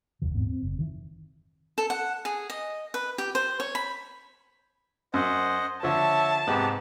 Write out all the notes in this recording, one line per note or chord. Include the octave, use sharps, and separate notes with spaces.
F1 D#2 E3
D#1 G#2 B3 C4
C4
F#1
D#3 E3
A4
F#5
G#4
D#5
B4
G4
C5
C#5
B5
F#2 C5 D#5 F#5
D3 F3 C#5 E5 A5
G#2 C3 B3 G4